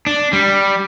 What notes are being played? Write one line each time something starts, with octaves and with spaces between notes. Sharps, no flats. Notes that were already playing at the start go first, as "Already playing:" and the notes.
D4
G3